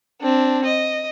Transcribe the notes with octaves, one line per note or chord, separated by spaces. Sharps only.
C4 D4
D#5